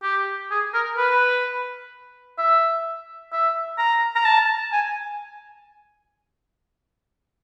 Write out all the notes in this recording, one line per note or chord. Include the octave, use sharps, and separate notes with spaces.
G4
G#4
A#4
B4
E5
E5
A#5
A#5
A5
G#5